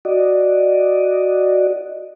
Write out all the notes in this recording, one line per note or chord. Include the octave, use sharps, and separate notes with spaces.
F#4 D5 D#5